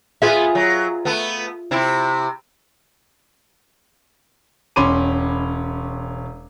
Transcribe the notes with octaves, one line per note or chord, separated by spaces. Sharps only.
B3 F4 G#4 E5
F#3
A3 B3
C3 E4
E1 C#4 B5 C6 D6 D#7